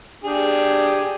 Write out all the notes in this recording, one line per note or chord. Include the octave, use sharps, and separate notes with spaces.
D4 G4 G#4